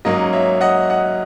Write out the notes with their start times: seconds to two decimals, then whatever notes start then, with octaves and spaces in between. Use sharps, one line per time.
0.05 G#2 F#3 A#3 C#4 D#5
0.33 C#5 E5
0.61 D#5 F#5
0.90 D#5 F#5